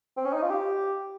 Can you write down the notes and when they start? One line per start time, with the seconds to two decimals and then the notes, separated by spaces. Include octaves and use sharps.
0.17 C4
0.25 C#4
0.33 D#4
0.42 F4
0.50 G4